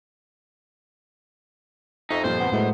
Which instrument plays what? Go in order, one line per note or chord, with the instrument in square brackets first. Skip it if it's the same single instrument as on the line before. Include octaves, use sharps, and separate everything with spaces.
[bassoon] F2 [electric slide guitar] D#4 [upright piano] E5 C#6 B6
[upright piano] G2 A#2 F3 [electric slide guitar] C5
[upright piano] G1 F2 [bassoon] B3
[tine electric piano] A2 G#3 [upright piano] F#3 A3 [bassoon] B3